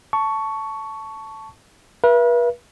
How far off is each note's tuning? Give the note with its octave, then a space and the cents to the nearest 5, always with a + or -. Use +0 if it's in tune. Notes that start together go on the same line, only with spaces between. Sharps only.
A5 +0 C#6 +10
B4 -40 E5 +35